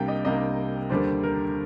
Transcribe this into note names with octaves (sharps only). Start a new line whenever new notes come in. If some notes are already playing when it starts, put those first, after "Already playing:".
Already playing: C2 C3 G3 A#3 D4 G5
D#5
C2 C3 G3 A#3 D4 D#5
D#2 D3 G3 D4 C5
A#4